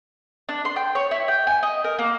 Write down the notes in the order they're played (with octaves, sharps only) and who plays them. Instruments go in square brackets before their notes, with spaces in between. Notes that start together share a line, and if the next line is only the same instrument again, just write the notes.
[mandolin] D4
C6
G5
C#5
E4
G5
G#5
D#5
A#4
A#3